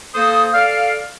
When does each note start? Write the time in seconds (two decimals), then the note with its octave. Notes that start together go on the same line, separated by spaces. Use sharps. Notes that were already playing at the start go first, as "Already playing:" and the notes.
0.15 A#3 A4 C5 D#6
0.54 A4 D5 F5